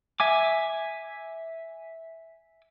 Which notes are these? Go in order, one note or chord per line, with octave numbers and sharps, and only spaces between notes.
E5 G#5 D6